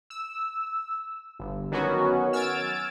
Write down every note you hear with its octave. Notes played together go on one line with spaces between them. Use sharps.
E6
G1
D#3 F#3 B3 C#4 F#4
E6 F6 G#6 A6 D7